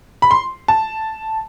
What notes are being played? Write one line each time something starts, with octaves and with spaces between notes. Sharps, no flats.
B5
C6
A5